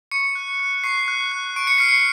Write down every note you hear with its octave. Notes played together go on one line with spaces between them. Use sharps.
C#6 C#7
F#6
F#6
C#6 C7
F#6
F#6
C#6 D7
C#7
F6 C7
C#7